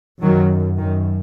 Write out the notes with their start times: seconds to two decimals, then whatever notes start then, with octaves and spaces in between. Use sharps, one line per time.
0.21 F#2 D#3 F#3
0.78 F#2 D#3